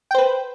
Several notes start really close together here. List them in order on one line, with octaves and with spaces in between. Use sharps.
G5 C5 B4